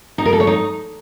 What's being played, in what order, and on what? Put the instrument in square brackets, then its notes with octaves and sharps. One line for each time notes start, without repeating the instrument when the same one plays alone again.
[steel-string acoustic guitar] D#4
A#4
A4
C#5
D#4